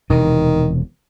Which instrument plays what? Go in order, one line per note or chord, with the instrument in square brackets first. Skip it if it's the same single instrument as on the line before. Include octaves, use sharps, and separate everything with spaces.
[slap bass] E1 C3 E3 [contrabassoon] D#3